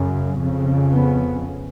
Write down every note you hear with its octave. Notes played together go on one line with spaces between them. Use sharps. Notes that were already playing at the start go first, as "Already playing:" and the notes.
Already playing: F#2 C#3
F2 C#3
B3